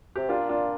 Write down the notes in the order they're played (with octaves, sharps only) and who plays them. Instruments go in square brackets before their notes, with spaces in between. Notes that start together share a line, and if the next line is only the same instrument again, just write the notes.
[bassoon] C3 [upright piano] G4
[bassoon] A#2 [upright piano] D4 F4
[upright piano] D4 F4